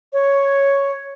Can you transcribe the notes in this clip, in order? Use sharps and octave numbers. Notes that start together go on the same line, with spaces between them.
C#5